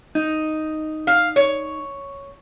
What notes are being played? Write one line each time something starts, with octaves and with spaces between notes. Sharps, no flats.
D#4
F5
C#5